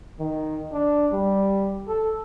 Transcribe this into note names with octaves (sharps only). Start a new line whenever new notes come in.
D#3
D4
G3
A4